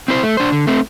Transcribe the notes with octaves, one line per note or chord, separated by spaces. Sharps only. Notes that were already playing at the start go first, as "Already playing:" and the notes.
C4 E4 C5
A3
D4 C5
D3
A3 C4